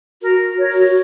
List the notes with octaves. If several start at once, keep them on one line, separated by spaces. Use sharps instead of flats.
F#4 A#4
A#4 C#5
F#4
F#4